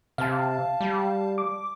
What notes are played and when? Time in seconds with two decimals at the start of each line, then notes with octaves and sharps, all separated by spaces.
0.18 C3 F5 A5
0.80 G3
1.38 D6